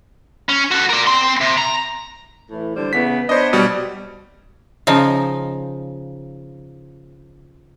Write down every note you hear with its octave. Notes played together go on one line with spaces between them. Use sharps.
C#4
F#4 A4
A#4 D5
C4 C6
C3
A#5
A2 E3
D3 G3 C5
C#3 E3 B3 B6
B3 D4 C5 C#5 D#5
B2 G3
C#3 F3 D#4